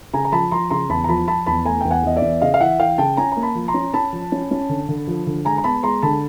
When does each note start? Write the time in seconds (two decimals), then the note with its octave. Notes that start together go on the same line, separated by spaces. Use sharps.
0.13 C#3 G#5 A#5
0.25 A#5
0.32 F3 A5 B5
0.51 F3 A#5 C6
0.70 C#3 A#5 C6
0.89 E2 A5 B5
1.04 A#5
1.08 F3 A5 B5
1.28 F3 A5 B5
1.46 E2 A5 B5
1.65 A3 G#5 A#5
1.81 E2 G5
1.90 F#5 G#5
2.03 E2 D#5
2.16 D5 E5
2.22 E2
2.41 C#3 D#5 F5
2.54 F5
2.60 E3 E5 F#5
2.79 E3 F5 G5
2.98 C#3 G5 A5
3.17 C#4 G#5 A#5
3.32 A#3 A#5
3.43 A5 B5
3.55 F3
3.68 A#5 C6
3.74 C#4
3.94 C#4 A5 B5
4.13 F3
4.32 C#4
4.51 C#4
4.69 D3
4.89 D3
5.07 F3
5.27 D3
5.45 G#3 G#5 A#5
5.58 A#5
5.64 B3 A5 B5
5.83 G#3 A#5 C6
6.02 D3 A5 B5